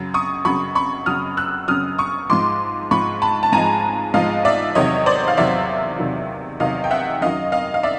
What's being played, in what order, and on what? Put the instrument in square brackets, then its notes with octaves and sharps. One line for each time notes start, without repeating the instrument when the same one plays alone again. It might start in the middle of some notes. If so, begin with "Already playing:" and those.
Already playing: [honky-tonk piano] F#2 C#3 F#3
C#6 D#6
F#2 C#3 F#3 B5 C#6
B5 C#6
F#2 C#3 F#3 D#6 F6
E6 F#6
F#2 C#3 F#3 D#6 F6
C#6 D#6
G#2 F3 G#3 C6 D6
G#2 F3 G#3 B5 C#6
A5 B5
A5
G#2 F3 G#3 G#5 A#5
G#2 F3 G#3 D#5 F5
D5 E5
E2 C3 D#3 F#3 C#5 D#5
C5 D5
F5
E2 C3 D#3 F#3 D5 E5
E2 C3 D#3 F#3
E2 C3 D#3 F#3 D#5 F5
G5
E5 F#5
F#2 D#3 F#3 D#5 F5
D#5 F5
F5
D5 E5